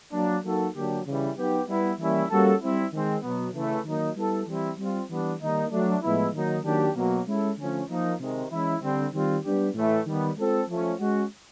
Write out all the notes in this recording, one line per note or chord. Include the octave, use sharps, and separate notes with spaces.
F#3 A#3 D4
F#3 A#3 D#4 F#4 A4
D3 F#3 A#3 D4 G4
C#3 E3 G3
F#3 B3 D#4 G4
G3 B3 E4
E3 G3 A#3 C#4 E4
G3 A#3 C#4 F#4 A4
G3 C4 E4
D#3 G#3 C4
B2 F#3 B3
C#3 E3 A3
D#3 F#3 A#3 D#4
G3 B3 E4 A4
E3 G3 C4 E4
G3 C4 F4
E3 G3 B3 D4
D#3 G3 A#3 D#4
F#3 A3 D4
A2 F3 G#3 B3 E4
D#3 F#3 A#3 D#4
D#3 F#3 A#3 D4 G4
B2 F#3 A#3
G#3 C#4 E4 A4
D3 F3 A3 C#4
F3 A#3 D#4
C3 D#3 G#3
E3 G#3 C#4 E4
D3 G3 C4
D#3 G3 C4 F4
G3 B3 D4 G4
A2 E3 A3
D#3 G3 B3
G#3 C4 F4 A4
F3 A3 C#4
G#3 C#4 F#4